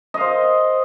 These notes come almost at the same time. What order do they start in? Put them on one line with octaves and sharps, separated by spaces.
D#5 F5 C5